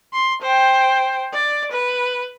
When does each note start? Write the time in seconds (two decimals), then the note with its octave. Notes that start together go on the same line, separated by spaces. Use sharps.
0.13 C6
0.42 C5 G5
1.34 D5
1.72 B4